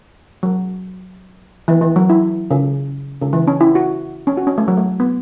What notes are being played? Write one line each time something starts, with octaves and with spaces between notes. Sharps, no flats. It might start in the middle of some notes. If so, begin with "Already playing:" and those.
F#3
E3
E3
F#3
E4
C#3
C#3
E3
C#4
E4
F#4
C#4
F#4
C#4
A3
F#3
A3
B3